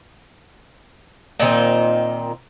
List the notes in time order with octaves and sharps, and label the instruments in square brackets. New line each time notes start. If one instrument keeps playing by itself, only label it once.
[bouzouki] A#2 D#3 C4 D#4